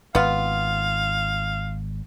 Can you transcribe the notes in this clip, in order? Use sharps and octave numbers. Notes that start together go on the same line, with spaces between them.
G#1 B3 F4 F5